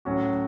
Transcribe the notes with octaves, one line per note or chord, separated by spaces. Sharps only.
A2 F#3 C#4 F#4